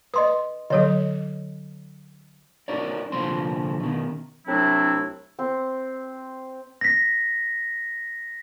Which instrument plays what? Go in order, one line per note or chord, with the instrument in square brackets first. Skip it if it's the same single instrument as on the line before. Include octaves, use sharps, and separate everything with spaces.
[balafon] B4 [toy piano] D#5 C6 D#6
[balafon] D3 F#3 [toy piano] A4 C#5 D#5
[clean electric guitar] D#4 F#4 A#4 C#5 D5
C2 A#2 D3 F3 C4 C6
B2 D#3
[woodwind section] C2 F#3 A3 C4 D4 E4
[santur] C4
[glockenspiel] A#6 B6